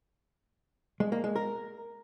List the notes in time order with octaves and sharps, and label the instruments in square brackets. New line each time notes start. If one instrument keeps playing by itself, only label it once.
[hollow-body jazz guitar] G#3
A#3
G#3
A#4